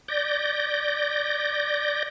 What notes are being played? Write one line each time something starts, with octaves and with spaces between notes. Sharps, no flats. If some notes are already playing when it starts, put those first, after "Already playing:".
D5 G6 A#6